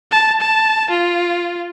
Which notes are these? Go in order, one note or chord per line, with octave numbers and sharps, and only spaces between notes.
A5
A5
F4